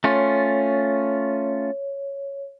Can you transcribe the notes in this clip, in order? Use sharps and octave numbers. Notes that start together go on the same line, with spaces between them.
A3 C#4 F4 C#5